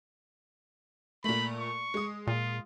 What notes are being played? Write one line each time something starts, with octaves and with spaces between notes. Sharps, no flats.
A#2 A3 B5
C#6
G#3 D#6
A#2 F4